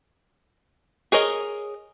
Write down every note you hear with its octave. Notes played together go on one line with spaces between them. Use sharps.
G#4 A#4 C#5 D#5